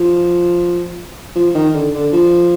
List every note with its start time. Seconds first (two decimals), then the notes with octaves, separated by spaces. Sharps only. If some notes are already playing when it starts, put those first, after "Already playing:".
Already playing: F3
1.36 F3
1.55 D#3
1.74 D3
1.94 D3
2.13 F3